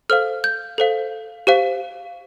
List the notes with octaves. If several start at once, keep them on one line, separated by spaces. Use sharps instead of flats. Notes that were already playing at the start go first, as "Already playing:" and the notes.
A4 C5 F5 F6
G6
A4 C5 F5
G4 C5 F5